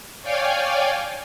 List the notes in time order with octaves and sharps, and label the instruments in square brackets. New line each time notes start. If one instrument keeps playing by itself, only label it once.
[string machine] C#5 D5 F5 G5 G#5